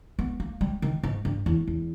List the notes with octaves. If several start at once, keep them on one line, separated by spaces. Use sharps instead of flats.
B3
A#3
G3
D#3
G#2
G2
E2
E2